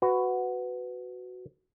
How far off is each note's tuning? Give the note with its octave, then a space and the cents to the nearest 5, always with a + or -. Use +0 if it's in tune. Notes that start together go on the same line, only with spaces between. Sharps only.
F#4 +0 B4 +15